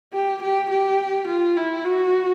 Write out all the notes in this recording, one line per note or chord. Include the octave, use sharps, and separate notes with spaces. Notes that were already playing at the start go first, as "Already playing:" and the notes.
G4
G4
G4
F4
E4
F#4